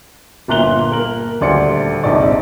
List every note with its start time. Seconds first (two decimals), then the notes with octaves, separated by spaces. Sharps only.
0.48 G1 A#2 A#5 F#6 F7 G7
0.91 A#3 A#4 F#7
1.41 D#1 D2 D5 C6 C#7
2.04 F1 A#1 G#2 D#4 D5